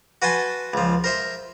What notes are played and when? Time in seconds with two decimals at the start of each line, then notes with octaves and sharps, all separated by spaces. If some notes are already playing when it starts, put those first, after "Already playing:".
0.22 F#4 B4 F#5 G#5 A5 C6
0.74 C#2 F3
1.04 A#4 C5 E5